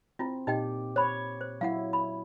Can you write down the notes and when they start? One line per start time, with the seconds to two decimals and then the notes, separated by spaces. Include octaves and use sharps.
0.19 C4 E4 F4
0.47 A#2 D#4 G4 D#5 G5
0.96 C5 C#5 B5
1.41 C5
1.61 F#3 E4 F5 F#5
1.93 B5